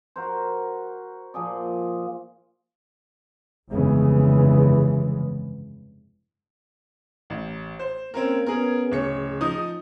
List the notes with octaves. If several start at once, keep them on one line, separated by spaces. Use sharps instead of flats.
F#4 A#4 C5
A#2 F3 G#4 D5
F1 G2 C#3 E3 G#3 B3
A1
C5
A#3 C4 C#4 A#4
B3 C#4 G#4 A#4
D1 C#3 C#5 C#7
F3 D#4 D#6